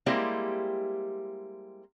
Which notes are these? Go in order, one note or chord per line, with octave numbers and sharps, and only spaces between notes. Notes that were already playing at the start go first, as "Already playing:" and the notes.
G3 G#3 A#3 C4 E4 G4